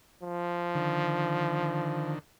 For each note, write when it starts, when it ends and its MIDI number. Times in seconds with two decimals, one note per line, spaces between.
0.23 2.12 53
0.75 2.19 50
0.75 2.19 51